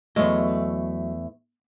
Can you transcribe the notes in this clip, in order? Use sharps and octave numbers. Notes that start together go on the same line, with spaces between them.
E2 F#3 A3 D#5